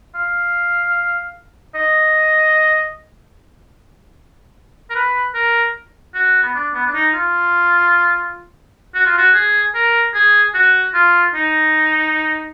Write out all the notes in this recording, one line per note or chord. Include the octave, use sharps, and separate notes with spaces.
F5
D#5
A#4
B4
A#4
F#4
B3
D4
B3
D4
D#4
F4
F#4
F4
F#4
G#4
A#4
G#4
F#4
F4
D#4